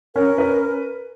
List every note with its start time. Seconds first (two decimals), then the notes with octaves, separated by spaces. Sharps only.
0.15 C#4 A#4
0.38 B4